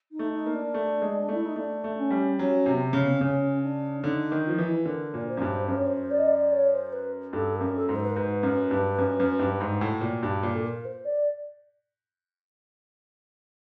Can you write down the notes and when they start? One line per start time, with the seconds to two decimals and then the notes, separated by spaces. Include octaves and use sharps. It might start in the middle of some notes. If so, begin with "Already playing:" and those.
0.12 D#4
0.19 A3
0.32 D#4
0.46 A#3
0.53 D4
0.74 A3
1.02 G#3
1.29 A3 E4
1.45 D#4
1.56 A3 D4
1.84 A3
1.97 C#4
2.11 G3
2.38 F#3 C#4
2.66 C3
2.72 B3
2.80 C4
2.93 C#3
3.03 B3
3.12 C4
3.21 C#3 C#4
3.62 D4
3.99 D4
4.03 D3 D#4
4.32 D#3
4.45 F4
4.49 F3 E4
4.58 E3 D#4
4.68 E4
4.86 D3 A#4
5.14 A#2
5.28 C5
5.37 F#2
5.42 G2
5.68 F#2 C5
5.77 C#5
5.86 C5
6.10 D5
6.18 D#5
6.26 D5
6.52 C#5
6.72 C5
6.92 B4
7.33 G2 A4
7.55 A#4
7.61 F#2
7.75 A4
7.89 G#2
7.95 C5
8.02 B4
8.10 A#4
8.16 G#2 B4
8.43 F#2
8.71 G2
8.98 F#2
9.20 F#2
9.39 G2
9.60 G#2
9.81 A2
10.01 A#2
10.23 G2
10.43 A#2
10.53 A4
10.64 A#4
10.85 C5
11.04 D5